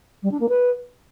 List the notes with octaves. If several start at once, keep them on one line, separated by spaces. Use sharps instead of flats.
G3
D4
A#3
B4